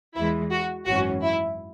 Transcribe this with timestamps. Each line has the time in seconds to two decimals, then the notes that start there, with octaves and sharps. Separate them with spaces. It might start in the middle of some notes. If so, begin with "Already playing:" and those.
0.15 E2 E3 G#3 E4
0.51 F#4
0.86 G#1 F#2 E3 C#4 F#4
1.23 E4